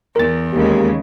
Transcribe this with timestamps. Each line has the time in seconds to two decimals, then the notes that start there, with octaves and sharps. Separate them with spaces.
0.16 E2 A#4 A6
0.53 D#2 C#3 G#3 A#3 G4